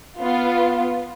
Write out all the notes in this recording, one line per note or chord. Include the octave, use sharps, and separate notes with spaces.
B3 F4